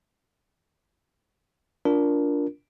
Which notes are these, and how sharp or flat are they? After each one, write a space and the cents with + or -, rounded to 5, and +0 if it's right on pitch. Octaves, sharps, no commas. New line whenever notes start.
D4 -15 F4 +0 A#4 +10